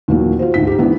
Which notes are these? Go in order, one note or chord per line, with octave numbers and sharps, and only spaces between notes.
D#2 A#2 E3 F#3 A#3
F4 F#4 C5
D2 G#2 D#4 B6
D#4 G4
D#3 E3 G#3 B3 D4 E4